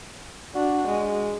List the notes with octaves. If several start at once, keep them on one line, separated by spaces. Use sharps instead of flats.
D4 F#4
G#3